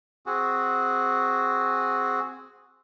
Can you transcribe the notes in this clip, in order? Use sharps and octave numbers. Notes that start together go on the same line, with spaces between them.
C4 F#4 G#4